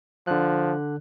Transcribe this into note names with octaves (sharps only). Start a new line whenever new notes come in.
D3 F3 F#6